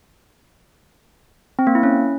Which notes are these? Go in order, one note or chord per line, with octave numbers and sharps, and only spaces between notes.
C4
A#3
E4
C#4